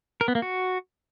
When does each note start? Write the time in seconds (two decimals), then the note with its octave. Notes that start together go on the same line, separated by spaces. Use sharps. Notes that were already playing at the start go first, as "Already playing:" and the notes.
0.21 A#4
0.28 B3
0.35 A#3
0.42 F#4